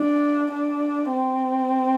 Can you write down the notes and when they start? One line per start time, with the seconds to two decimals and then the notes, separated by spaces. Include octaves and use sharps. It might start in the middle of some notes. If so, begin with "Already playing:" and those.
Already playing: D4
0.51 D4
1.12 C4